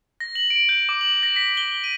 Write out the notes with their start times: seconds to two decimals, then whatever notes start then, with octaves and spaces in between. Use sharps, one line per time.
0.20 A#6
0.35 F#7
0.50 D7
0.69 G6
0.89 D6
1.01 F#7
1.23 A#6
1.36 B6
1.57 G7
1.84 D#7